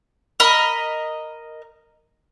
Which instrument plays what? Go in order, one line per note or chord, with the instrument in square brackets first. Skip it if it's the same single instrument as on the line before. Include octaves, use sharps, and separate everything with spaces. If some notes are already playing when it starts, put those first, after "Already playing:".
[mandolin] A#4 D#5 B5